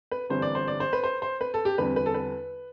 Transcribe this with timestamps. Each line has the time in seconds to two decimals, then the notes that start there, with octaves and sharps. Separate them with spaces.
0.11 B4
0.30 G1 G2 E3 G3 C4 C5
0.42 D5
0.55 C5
0.68 D5
0.80 C5
0.93 B4
1.03 C5
1.22 C5
1.41 B4
1.54 A4
1.65 G4
1.78 E2 D3 G3 C4 B4
1.96 B4
2.06 A4
2.14 B4